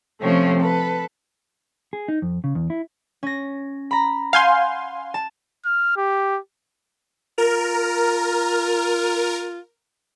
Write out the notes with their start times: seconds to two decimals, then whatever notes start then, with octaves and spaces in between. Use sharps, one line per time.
0.21 C3 F3 A3 C4 C#4
0.60 A4 B4
1.93 G#4
2.08 D#4
2.22 F2
2.44 C#3
2.55 E2
2.70 E4
3.23 C#4 A#6
3.91 A#5 B5
4.33 F5 F#5 G#5 C6 F6 G6
5.14 A5
5.65 F6
5.96 G4
7.38 F4 A#4